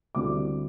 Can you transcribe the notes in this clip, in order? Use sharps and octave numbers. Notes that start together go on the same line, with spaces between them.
D2 D3 G3 C4 E4 D6